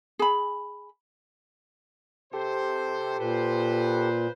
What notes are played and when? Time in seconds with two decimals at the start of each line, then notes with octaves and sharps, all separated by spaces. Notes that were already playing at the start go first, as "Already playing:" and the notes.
0.19 G#4 B5
2.33 C3 G4 A4 C5
3.19 A#2 B4 C5